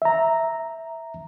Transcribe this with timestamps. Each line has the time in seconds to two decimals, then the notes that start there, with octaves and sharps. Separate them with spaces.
0.02 E5 A#5